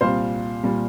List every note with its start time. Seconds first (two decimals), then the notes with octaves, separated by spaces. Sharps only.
0.01 C2 A#2 G3 C5 F5
0.63 A#2 G3